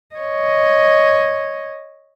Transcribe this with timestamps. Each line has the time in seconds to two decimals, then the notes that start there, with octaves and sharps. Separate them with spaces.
0.16 C#5 D#5